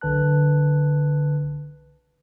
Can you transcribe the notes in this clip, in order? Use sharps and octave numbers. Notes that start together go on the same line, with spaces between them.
B1 D3 B4 A5 F#6